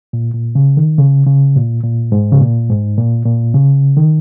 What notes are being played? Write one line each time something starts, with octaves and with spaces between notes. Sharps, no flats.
A#2
A#2
C#3
D#3
C#3
C#3
A#2
A#2
G#2
C#3
A#2
G#2
A#2
A#2
C#3
D#3